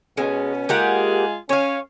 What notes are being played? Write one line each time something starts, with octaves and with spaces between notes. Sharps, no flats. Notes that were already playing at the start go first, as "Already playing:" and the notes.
B2 G#3 B3 C#4
G#3 A#3 F4 G4 G#4 F#5
C#4 C#5 F5